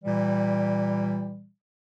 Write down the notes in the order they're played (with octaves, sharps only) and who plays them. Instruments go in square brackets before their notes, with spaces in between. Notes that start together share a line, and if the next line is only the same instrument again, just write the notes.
[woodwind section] A#2 E3 G3